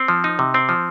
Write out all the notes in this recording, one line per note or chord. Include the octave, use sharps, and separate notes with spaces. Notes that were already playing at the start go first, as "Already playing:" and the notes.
Already playing: C4
F3
D#4
C3
C4
F3